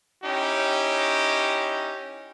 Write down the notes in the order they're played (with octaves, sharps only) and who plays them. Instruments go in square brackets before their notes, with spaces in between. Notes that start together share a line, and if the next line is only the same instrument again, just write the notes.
[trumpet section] C#4 D#4 E4 G4